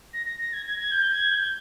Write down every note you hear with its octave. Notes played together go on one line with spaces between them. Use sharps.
A#6
A#6
A#6
G#6
G#6
G#6
G6
G#6
G6